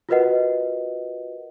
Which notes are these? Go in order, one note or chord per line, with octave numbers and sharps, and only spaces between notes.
F4 F#4 A#4 B4 D#5 F#5